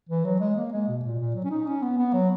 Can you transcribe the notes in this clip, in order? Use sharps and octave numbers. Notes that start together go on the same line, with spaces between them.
E3
F#3
G#3
A#3
G#3
B2
A#2
A#2
F#3
C#4
D#4
C#4
B3
B3
F#3